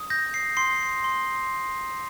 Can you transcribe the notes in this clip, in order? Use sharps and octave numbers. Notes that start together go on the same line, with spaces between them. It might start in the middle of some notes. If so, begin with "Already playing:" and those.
Already playing: D#6
G6 A#6
C7
C6 C7
C6